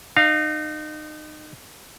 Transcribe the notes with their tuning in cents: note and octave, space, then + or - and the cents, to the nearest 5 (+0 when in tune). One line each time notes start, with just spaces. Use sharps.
D#4 -30 F5 +0